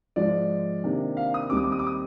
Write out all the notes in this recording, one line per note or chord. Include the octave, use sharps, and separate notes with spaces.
G#2 F3 G#3 D5
C3 D#3 A#3 D4
F5
D#6
D#2 D#3 G3 C4 D6
D#6
D6
D#6
D6
D#6